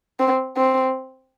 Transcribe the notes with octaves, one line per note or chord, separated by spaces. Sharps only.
C4
C4